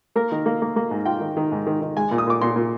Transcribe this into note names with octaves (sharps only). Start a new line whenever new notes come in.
A#3 A#4
D#3
A#3
A#3
A#3
G#2
F4 G5
D#3
D#3
G#2
D#3
D#3
G#3 G#5
A#2
D#6
A#2 D6
A#2 C6
A#2